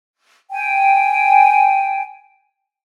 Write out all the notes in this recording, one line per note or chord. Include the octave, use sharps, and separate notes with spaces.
G5 G#5